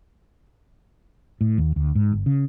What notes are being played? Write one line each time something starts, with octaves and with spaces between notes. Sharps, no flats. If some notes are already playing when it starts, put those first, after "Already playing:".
A2
D#2
D2
G#2
G1
C#3